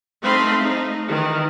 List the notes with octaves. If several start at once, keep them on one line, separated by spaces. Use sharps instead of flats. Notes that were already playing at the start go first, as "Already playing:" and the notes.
A3 C4 D#4 F5 B5 C6
A3 D#4
D#3 E3